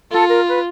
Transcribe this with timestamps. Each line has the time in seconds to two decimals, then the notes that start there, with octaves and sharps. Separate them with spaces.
0.11 F4 A4
0.28 A#4
0.47 B4